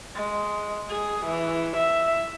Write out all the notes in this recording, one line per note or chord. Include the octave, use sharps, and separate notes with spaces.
G#3
G#4
E3
E5